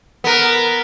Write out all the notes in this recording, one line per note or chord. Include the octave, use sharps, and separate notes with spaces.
B3 A#4